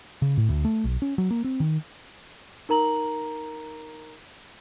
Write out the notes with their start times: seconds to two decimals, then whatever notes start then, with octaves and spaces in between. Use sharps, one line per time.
0.22 C#3
0.37 A2
0.49 D2
0.65 A3
0.84 B1
1.02 C#4
1.18 F#3
1.31 A#3
1.45 C4
1.60 D#3
2.69 D#4 A#4 A#5 F#7